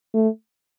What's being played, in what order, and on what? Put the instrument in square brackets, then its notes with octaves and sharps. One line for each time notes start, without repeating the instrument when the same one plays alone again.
[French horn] A3